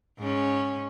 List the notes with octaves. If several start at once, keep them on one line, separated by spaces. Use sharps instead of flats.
G#2 C#4